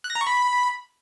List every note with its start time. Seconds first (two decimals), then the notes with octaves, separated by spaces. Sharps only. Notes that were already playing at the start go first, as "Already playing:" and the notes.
0.04 F#6
0.10 A#6
0.15 A#5
0.21 C#6
0.27 B5